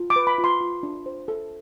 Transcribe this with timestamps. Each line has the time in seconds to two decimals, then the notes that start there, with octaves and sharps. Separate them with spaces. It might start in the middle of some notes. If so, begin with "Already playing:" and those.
Already playing: F4
0.10 D6
0.16 B4
0.27 B5
0.38 F4
0.44 C6
0.61 F4
0.83 D4
1.06 C5
1.28 A4